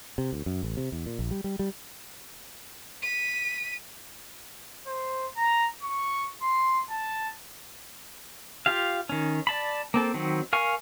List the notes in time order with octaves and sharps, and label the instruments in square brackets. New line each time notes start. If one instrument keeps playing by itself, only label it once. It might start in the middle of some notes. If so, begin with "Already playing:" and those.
[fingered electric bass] C3
D2
F#2
A1
C3
E2
A#2
A#1
G3
G3
G3
[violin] B6 D#7
[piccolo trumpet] C5
A#5
C#6
C6
A5
[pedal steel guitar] F4 G4 F5
D#3 C#4
D5 A5 B5
A#3 C4 A4
D#3 F#3 C4
A#4 F5 G#5 C#6